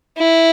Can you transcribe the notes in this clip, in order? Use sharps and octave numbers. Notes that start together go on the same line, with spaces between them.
E4